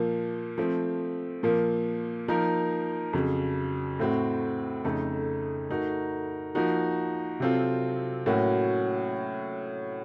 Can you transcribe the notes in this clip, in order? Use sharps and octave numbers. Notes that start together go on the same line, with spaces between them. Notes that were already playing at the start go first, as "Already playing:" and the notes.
Already playing: A#2 F3 A#3
F3 A3 C4
A#2 F3 A#3
F3 A#3 D#4 A#4
F2 C#3 F#3
A2 A3 C4 F#4
F2 C#3 A3 D#4 A4
A3 D#4 F#4 A#4
F3 A#3 D#4 F#4
C3 F#3 C4 F4 A4
A2 F#3 A#3 C#4 F#4